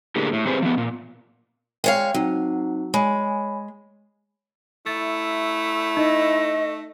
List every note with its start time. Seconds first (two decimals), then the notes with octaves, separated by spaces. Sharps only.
0.16 A2 D3 A#3 G4 G#4
0.33 A2
0.47 C4 G4 G#4 B4 C5
0.62 F3 B3
0.78 A#2
1.84 G#3 C#5 F5 G5
2.14 F#3 C4 D#4
2.94 G#3 C#5 G#5 B5
4.86 A3 E4 A6
5.97 D#4 D#5